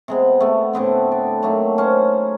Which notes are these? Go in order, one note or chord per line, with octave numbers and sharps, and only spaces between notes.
C3 G#3 B3
A3 B3
A2 D3 B3 C4
D5
F#3 A3 A#3 D#4
C#4 C5